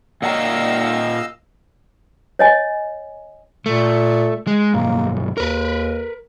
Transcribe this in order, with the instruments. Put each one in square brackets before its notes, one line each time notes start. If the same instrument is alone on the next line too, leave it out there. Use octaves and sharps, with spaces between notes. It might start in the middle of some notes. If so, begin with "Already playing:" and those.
[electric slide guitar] A#2 F#5 A#5 [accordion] D#5 F5 E6
[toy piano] C#5 D#5 G#5
[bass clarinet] A#2 [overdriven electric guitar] A3
[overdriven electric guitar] G#3
[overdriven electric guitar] B1 G2 [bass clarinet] A#3
[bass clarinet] D#2 [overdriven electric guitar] A#4 B4